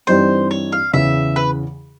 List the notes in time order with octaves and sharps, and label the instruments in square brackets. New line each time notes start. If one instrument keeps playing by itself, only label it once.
[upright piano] G2 E3 G3 C4 D#4 [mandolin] C5
[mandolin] C#5
F5
[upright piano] E2 C#3 E3 [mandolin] E5
[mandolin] B4